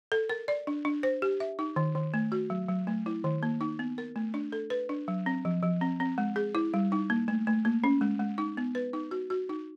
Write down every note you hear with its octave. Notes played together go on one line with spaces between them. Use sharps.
A4
A#4
D5
D4
D4
C5
G4
E5
D#4
D#3
D#3
A3
F#4
F#3
F#3
A3
E4
D#3
A#3
D#4
B3
A#4
A3
D4
A4
B4
D4
F#3
C4
F3
F3
C4
C4
G#3
G#4
E4
G3
D#4
A#3
A3
A3
A#3
C#4
G#3
G#3
D#4
B3
B4
D#4
F#4
F#4
D#4